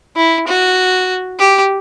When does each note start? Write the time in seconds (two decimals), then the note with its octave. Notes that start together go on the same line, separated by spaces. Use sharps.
0.17 E4
0.47 F#4
1.39 G4